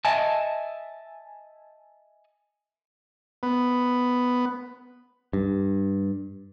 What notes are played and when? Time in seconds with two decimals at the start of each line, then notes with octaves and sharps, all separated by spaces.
0.05 D#5 E5 G#5 A5
3.43 B3
5.33 G2